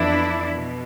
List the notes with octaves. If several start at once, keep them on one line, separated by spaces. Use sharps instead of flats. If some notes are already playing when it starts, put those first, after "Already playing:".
Already playing: F2 E3 B3 D4 E4
B2